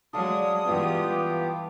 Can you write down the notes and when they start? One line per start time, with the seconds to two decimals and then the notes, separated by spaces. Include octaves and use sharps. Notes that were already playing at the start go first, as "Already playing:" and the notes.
0.13 F#3 G#3 A4 D5 F5 D#6
0.65 G2 E3 G#3 B3 F4 G4
1.08 E3